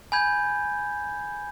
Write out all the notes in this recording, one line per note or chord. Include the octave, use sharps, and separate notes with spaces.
G#5 B5 G6 G#6